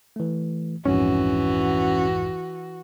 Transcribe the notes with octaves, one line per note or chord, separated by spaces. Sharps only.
E3 A3
A#1 F2 G#2 E3 C#4 F#4